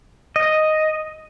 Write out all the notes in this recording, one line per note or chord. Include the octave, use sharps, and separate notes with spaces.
D#5